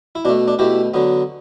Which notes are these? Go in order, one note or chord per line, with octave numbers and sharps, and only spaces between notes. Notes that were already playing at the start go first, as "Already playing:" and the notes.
E4
B2 A3 D4
D4
B2 A3 E4 G4
D3 F#3 B3